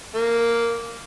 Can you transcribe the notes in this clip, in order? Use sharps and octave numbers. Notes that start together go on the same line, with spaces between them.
A#3